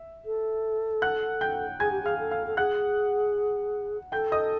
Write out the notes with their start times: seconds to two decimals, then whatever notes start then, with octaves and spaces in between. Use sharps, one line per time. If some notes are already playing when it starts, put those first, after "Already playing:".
Already playing: E5
0.25 A4
1.02 F#5 F#6
1.41 G5 G6
1.80 G#4 G#5 G#6
1.91 G4
2.02 G#4 F5 F6
2.18 A4
2.31 F5 F6
2.46 A4
2.57 G#4 F#5 F#6
4.12 A4 G5 G6
4.32 D#5 D#6